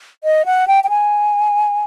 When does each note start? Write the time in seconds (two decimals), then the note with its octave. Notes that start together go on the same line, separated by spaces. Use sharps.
0.24 D#5
0.46 F#5
0.68 G5
0.84 G5
0.89 G#5